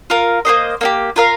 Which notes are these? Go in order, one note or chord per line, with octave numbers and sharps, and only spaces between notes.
F4 A#4 F5
A#3 G4 C5 D#5
A#3 D#4 G4
F4 A#4 F5